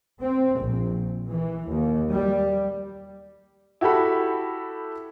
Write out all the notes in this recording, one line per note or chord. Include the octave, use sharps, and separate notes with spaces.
C4
A#1
E3
D#2
G3
E4 F#4 G4 A4 B5